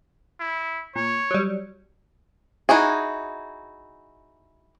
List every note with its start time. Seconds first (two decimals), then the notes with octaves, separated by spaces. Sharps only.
0.40 E4
0.96 A#2 C#5
1.31 F#3 G3
2.69 D#4 E4 F#4 G#4